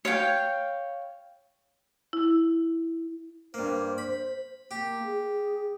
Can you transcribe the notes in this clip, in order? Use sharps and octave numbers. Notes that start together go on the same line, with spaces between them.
C#5 F5 G5
E4
G2 A#3 C5
B5
A#3 G4
G#4